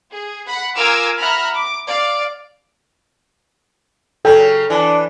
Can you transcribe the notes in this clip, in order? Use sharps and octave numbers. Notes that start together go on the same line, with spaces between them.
G#4
F#5 B5
F4 A#4 G#5 D6 E6 F6
E5 F#5 A#5 B5 F6
D6
D5 F5
C#3 F#3 A4 G5
E3 D4